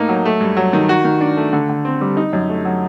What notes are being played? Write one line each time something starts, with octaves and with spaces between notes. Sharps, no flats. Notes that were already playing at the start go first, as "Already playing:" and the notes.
Already playing: A2 A3 A#3 D#4
F#3
A3
G2
F#3
D#3
F#4
D#3
D4
A3
D3
D3
C4
G3
D#4
F#2
A3
F#3